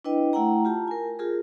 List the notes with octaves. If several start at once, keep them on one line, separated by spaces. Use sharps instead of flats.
D4 E4 B4 D#5 G5
A3 E4 F#5 G5 A#5
F4 G4 A5
A#4 G#5
F4 G4 G#4 A#4